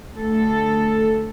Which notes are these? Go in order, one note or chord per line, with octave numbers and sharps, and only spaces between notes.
D2 A4